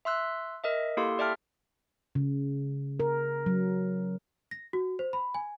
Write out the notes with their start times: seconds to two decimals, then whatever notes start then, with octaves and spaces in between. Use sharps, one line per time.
0.05 E5 C6 E6 F#6
0.64 A#4 D#5 E5
0.97 A#3 E4 G4 A4 F5 C6
1.18 G4 D5 E5 G5 A5 F6
2.15 C#3
3.00 A#4
3.46 F#3
4.51 A#6
4.73 F#4
4.99 C5
5.13 B5
5.35 G#5